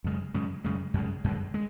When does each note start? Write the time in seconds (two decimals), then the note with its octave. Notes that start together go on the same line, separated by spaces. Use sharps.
0.04 F#2 C#3 G#3
0.34 F#2 C#3 G#3
0.64 F#2 C#3 G#3
0.94 F#2 C#3 G#3
1.24 F#2 D3 G#3
1.54 G#3